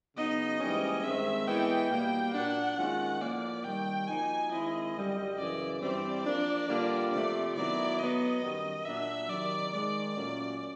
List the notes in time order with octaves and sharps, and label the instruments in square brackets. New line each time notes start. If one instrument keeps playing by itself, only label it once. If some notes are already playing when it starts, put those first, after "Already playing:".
[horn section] C#3 F#3 B3 D#4 [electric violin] D#5
[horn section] G#2 E3 G3 A#3 C#4
[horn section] G2 D#3 G#3 C4 [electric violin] E5
[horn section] A2 E3 G#3 B3 E4 [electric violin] G5
[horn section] B2 G3 A#3
[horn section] A#2 F#3 A#3 D4 [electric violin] F#5
[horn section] G#2 D#3 G#3 C#4 F4
[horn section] A2 F3 A#3 [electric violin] D5
[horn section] C3 D#3 G3 [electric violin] G5
[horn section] F3 A#3 D#4 F#4 [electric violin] G#5
[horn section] D#3 G#3 C4 E4 [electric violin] D#5
[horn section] F#2 D3 G3
[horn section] F#2 C#3 E3 [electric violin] D5
[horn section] G2 E3 G3 C4 [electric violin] D5
[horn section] F3 A#3 D4
D3 G3 A#3 D4 F4
[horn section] C3 F3 A3 [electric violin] D5
[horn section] D#3 F#3 B3 E4 [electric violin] D5
[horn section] A2 F#3 B3 [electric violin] D#5
[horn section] F#2 D#3 G3
[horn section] A#2 F#3 A#3 D4 [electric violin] E5
[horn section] C3 D#3 F#3 [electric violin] D5
[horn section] G#2 D#3 G#3 [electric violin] D5
[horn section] A#2 F#3 A3 C#4